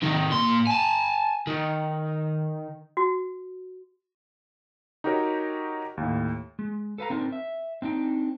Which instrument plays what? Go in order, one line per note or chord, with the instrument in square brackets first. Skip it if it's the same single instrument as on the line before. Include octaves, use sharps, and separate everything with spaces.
[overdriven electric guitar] C3 D#3
A#2 C6
G#5 A5
D#3
[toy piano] F#4
[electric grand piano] D#4 F#4 G4 A#4 C#5
D#2 A2
[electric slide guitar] G#3
A4 B4 F5 A#5
C4 D4 D#4 A#4
E5
C4 D4 D#4 G5